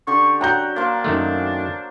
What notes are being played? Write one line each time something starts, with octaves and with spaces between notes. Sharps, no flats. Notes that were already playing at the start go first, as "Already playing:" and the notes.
D3 G4 C6 C#6
F#3 C#5 F#5 G5 A#5 G6
A#3 D4 C5 A5
F#2 D#3 A3